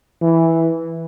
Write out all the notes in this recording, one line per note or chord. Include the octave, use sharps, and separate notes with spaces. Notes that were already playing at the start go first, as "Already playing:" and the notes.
E3